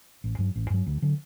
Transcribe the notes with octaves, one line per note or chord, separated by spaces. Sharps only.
A1
G2 F#3
A1
G2 F#3
D2
D3 F#3